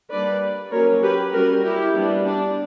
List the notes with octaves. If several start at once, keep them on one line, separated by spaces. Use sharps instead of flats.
G3 A#3 D4 B4 D5
F#3 A#3 C#4 A#4 C#5
G4 B4
G3 C#4 F#4 A#4
E4 G4
G3 B3 D4
D4